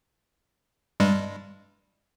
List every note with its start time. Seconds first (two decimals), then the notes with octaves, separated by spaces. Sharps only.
1.00 G2 G3 G#3